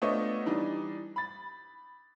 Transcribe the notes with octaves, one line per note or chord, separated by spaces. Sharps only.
A3 B3 D4 F4 C#5 D#5
E3 G3 D4 D#4
B5 A6